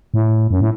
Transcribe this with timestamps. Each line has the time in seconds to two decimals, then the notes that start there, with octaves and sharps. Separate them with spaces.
0.14 A2
0.51 F#2
0.61 A2